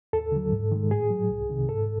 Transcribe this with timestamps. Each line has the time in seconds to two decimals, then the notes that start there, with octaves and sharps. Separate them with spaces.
0.13 D#2 A4
0.32 D3 F#3
0.52 G#2
0.72 D#3 G#3
0.91 A2 G#4
1.10 F#3
1.30 C2
1.49 C3 D#3
1.69 G#2 A4